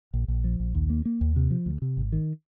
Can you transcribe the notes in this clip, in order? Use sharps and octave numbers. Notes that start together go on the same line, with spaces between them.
A#1
A#1
F3
A#1
D#2
A#3
A#3
D#2
C3
F3
D2
C3
G#1
D#3